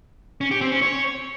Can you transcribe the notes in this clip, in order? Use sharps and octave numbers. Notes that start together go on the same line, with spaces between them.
C#4
G4
C4
C#4
C#5